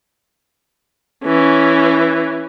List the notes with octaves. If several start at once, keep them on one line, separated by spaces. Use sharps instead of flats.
E3 C#4